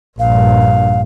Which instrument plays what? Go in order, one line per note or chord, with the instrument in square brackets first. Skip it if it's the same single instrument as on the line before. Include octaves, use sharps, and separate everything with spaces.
[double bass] A#1 G2 [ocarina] F5